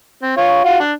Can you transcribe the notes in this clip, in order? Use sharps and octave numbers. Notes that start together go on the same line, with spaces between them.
C4
F4 C#5
F4 F#4 F#5
D4